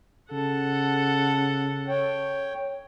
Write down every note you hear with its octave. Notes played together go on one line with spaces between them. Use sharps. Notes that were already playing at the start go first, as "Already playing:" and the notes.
C#3 A4 F#5
C#5 G5